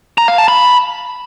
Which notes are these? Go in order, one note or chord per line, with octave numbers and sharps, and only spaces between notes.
A#5
F5
A5
B5